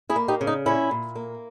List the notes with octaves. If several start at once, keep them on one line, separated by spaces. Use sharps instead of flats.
E4 G#4
A#3
D#4 G4
C#3
D#4
A#2 C#4 E4
A#2
A#3